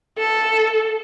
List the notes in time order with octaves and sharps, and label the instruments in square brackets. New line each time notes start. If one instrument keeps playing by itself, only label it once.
[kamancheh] A4